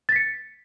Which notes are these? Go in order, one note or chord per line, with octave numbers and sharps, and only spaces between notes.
A6 B6 C#7